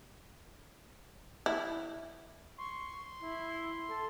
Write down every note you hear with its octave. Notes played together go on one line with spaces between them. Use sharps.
E4
C6 C#6
E4
A4